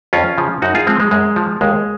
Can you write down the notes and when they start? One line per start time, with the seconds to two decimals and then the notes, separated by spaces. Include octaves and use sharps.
0.13 F2 C#4 F4
0.38 C#3 F3
0.62 F#2 D#4 F#4
0.75 F4 G#4
0.87 F3 G#3 C4
1.00 G#3
1.11 F#2 G#3
1.36 F3
1.61 D#2 G#3